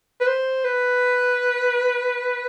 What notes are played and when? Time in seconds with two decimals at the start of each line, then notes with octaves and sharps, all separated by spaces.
0.21 B4
0.27 C5
0.64 B4